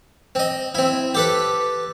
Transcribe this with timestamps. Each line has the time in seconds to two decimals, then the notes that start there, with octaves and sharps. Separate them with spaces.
0.35 C4 D#5
0.75 C4 E4
1.14 G4 A4 B4